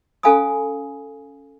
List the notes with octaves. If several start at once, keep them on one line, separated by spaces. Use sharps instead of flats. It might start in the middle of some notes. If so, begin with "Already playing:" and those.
C#4 A4 F5 G#5 B5 D#6